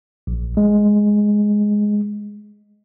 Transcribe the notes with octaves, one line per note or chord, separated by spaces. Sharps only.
A#1
G#3